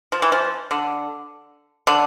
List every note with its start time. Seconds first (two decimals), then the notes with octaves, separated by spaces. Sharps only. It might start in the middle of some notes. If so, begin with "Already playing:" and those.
0.12 F3
0.22 E3
0.32 F3
0.71 D3
1.87 D3